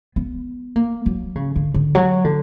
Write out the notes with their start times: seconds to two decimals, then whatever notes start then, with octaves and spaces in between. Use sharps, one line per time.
0.16 B3
0.76 A#3
1.06 F#3
1.36 C#3
1.56 D3
1.74 D3
1.95 F#3
2.24 D3